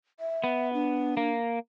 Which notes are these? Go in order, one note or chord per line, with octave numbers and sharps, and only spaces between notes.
E5
B3
D4
A#3